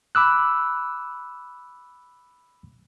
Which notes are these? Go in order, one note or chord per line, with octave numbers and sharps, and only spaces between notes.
B5 D6 E6 F#6